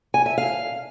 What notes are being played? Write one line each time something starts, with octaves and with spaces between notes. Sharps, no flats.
G#5
E5
F5